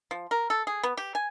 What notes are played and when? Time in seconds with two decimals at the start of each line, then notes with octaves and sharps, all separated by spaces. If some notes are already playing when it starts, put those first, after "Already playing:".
0.11 F3
0.31 A#4
0.50 A4
0.67 G#4
0.83 B3
0.97 G4
1.15 G#5